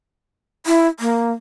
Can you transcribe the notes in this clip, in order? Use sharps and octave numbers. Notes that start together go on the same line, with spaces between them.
E4
A#3